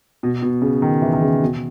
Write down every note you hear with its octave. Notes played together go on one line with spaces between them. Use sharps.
B2
B2
C#3
D#3
E3
D#3
C#3
B2